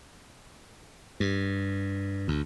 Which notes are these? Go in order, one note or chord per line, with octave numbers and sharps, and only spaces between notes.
G2
D2